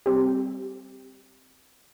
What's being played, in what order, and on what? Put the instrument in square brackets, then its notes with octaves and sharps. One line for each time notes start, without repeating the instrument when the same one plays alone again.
[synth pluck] G3 C4 G4